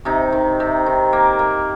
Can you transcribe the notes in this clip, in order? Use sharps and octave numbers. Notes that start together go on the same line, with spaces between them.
C3 D#4
D#3
C3
D#3
A#3
A#3